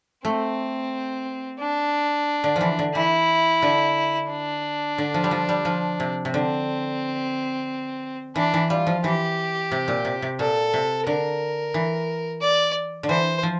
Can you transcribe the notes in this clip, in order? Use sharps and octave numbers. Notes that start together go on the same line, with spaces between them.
A3 C4
D4
D3
E3 F3
D3
E3 E4
D3
D4
D3
F3
G3
F3
G3
F3
C3
C3
D3 C4
E3 D4
E3
G3 F4
F3
E3 G4
C3
A#2
C3
C3
A#2 A4
C3
D3 A#4
E3
D5
D3
E3 C5
F3